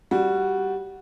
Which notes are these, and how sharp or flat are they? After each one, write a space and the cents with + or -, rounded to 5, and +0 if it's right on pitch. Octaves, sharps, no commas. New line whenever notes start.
G3 -10 F#4 +0